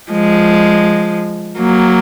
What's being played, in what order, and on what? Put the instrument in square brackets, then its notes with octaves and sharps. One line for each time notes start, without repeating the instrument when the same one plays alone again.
[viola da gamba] F3 G#3
F#3 A#3